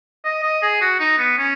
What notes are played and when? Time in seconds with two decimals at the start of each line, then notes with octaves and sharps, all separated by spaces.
0.24 D#5
0.43 D#5
0.62 G#4
0.81 F#4
1.00 D#4
1.18 B3
1.38 C#4